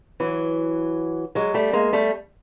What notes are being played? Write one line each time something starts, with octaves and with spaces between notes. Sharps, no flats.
E3 F#3
F#3 G#3
G3 A3
G#3 A#3
G3 A3